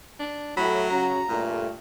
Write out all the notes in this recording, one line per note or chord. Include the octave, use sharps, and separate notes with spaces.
D4
A2 F#3 B5
C#3 C#4 F#4 A#5
G2 A#2 A3